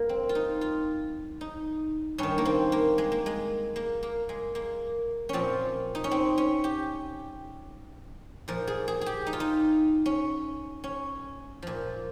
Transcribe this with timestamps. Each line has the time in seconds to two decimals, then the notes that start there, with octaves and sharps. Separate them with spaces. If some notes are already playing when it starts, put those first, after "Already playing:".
Already playing: G2 A#3
0.09 C4
0.29 F4
0.35 D#4
0.61 F4
1.41 D#4
2.18 G2 D#3 C#4
2.38 A#3
2.45 C4
2.72 A#3
2.98 G#3
3.12 A#3
3.26 G#3
3.76 A#3
4.03 A#3
4.29 G#3
4.55 A#3
5.29 A#2 F3 C4 C#4
5.95 D#4
6.04 C#4
6.11 C4
6.38 C#4
6.64 G4
8.48 A#2 F3 A#4
8.67 G#4
8.88 G#4
9.01 G4 G#4
9.27 D#4
9.33 F4
9.40 D#4
10.06 C#4
10.84 C#4
11.62 A#2 F3